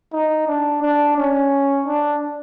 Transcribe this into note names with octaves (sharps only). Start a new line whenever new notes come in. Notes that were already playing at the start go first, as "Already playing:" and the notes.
D#4
D4
D4
C#4
D4